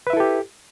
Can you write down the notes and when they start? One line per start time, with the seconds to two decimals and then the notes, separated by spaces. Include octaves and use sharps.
0.07 B4
0.10 E5
0.13 E4
0.17 A4
0.20 G4